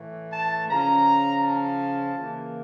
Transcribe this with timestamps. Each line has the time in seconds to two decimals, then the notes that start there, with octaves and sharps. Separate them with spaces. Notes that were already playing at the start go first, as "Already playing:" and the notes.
Already playing: A2 E3 A3
0.33 A5
0.69 C#3 F3 C#4 A#5
1.42 A5
2.14 C#3 E3 A#3